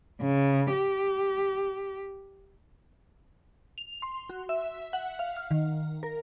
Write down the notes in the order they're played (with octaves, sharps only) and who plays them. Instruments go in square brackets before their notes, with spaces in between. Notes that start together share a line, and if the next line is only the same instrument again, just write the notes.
[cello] C#3
G4
[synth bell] F7
C6
F#4
E5
F#5
F5
F6
D#3
A#4